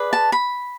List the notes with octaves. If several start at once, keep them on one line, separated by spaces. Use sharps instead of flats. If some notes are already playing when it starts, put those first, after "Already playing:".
Already playing: G#4 B4 D5
A5
B5